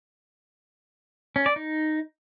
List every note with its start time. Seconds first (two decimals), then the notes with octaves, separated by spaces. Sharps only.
1.36 C#4
1.46 D5
1.56 D#4